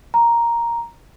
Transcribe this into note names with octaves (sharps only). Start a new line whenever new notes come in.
A#5